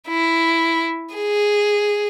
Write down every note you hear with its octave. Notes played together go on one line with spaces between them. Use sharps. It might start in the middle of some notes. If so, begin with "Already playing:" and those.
E4
G#4